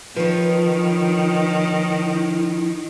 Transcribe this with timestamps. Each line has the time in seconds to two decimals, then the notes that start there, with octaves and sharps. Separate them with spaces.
0.16 D#3 F3 F4 B4 C#5
1.87 E4